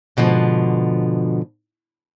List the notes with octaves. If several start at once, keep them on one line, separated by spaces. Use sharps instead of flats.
G#2 B2 D3 F3